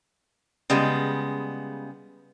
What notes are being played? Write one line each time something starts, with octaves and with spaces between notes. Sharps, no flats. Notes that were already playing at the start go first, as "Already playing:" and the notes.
C#3 G3 G#3 B3